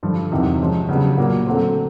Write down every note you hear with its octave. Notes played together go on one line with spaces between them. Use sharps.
G2 D3 F3
E2 C3 D#3 F#3
F3 G#3 C#4
C#3 F#3 B3 D4 G4
A#2 F#3 A#3
D3 F#3 A3 C4